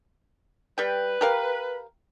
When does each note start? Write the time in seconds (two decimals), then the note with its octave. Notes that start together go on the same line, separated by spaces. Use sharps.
0.78 G3 B4 G5
1.21 G4 A#4 F5